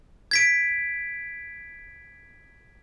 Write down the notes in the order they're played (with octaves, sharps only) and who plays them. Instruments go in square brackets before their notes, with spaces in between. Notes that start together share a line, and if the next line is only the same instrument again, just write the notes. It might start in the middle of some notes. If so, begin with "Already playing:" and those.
[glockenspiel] G#6 B6 D7